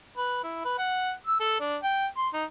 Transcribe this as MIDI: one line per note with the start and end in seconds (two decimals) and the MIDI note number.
0.17 0.40 71
0.43 0.61 64
0.65 0.75 71
0.79 1.12 78
1.26 1.39 88
1.40 1.60 69
1.60 1.76 62
1.83 2.06 79
2.17 2.28 84
2.33 2.44 63